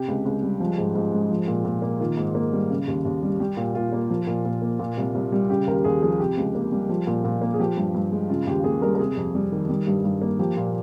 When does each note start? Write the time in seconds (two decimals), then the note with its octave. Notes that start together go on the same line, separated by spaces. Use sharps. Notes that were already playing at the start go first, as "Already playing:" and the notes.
Already playing: C3 G4
0.08 C#2
0.25 C#2
0.42 G3
0.60 F3
0.78 G#2
0.95 G#2
1.12 G#3
1.31 F3
1.48 A#2
1.65 A#2
1.82 A#3
2.00 D#3 F4
2.17 G#2
2.35 A#3
2.53 G3
2.70 C#3
2.88 D#2
3.05 D#2
3.23 G3
3.40 G3 G4
3.57 A#2
3.75 A#2 F4
3.92 A#3
4.10 F3
4.27 A#2
4.45 A#2
4.62 A#3
4.79 A#2
4.98 C2
5.15 C2
5.32 G3
5.50 C#3 G4
5.67 D#2 A#4
5.84 D#2 G#4
6.02 F3 G#4
6.20 C3 G4
6.37 C#2
6.55 A#3
6.72 G3
6.89 F3
7.07 A#2
7.24 A#2
7.42 A#3
7.54 G#4
7.59 F3 G4
7.77 G2
7.95 G2
8.12 G#3
8.29 C#3 F4
8.47 D#2 G4
8.64 A#3 G#4
8.82 G3 A#4
8.95 A#4
8.99 C3 G#4
9.17 F2
9.35 G3
9.52 D#3
9.69 G3
9.87 G2
10.04 G2
10.21 A#3
10.39 F3 G4
10.57 A#2